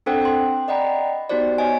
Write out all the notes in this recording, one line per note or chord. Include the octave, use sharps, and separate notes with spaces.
C4 D4 A4 C5 F#5 G5
G5 C6
D5 D#5 F#5 G5 A#5 B5
B3 D#4 F#4 G4 C5 D5
B3 C#5 D#5 G#5